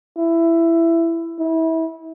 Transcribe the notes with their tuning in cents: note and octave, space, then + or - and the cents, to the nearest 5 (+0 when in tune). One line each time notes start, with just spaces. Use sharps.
E4 +15
E4 -25